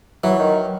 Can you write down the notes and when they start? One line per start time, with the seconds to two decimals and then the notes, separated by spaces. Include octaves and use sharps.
0.23 E3 F#3
0.39 D#3